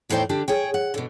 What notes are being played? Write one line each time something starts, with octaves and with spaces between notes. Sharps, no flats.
E2 A2 D#4 C5 D5 G5
D3 D4 G4
G#4 C#5 G5
F#5
B2 D3